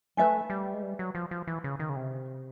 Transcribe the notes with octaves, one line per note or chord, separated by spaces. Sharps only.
A3 B4 E5 G#5
G3
G#3
G3
F#3
F3
F3
E3
C#3
D#3
C#3
C3